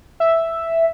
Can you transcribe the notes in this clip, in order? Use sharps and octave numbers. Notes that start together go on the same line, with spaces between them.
E5